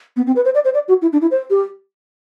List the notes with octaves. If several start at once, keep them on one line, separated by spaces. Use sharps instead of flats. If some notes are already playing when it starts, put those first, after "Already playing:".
B3
C4
B4
C5
D5
C5
D5
F#4
E4
D4
E4
C5
G4